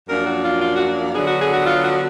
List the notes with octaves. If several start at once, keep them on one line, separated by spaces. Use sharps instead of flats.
F#2 F3 A#3 D4 A#4
F#4
F4
F4
F#4
D3 F#3 B3 D4 G#4
F#4
G#4
F#4
F4
F#4